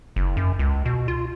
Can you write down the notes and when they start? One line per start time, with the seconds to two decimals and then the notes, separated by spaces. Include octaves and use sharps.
0.16 F#1
0.37 F#2
0.59 C#2
0.86 B2
1.08 F4